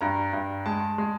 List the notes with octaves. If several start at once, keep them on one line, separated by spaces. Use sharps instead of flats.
G2 A#5
G2
G#3 A5
G#3